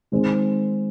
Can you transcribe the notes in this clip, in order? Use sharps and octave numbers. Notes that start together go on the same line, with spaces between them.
D#3 G#3 C4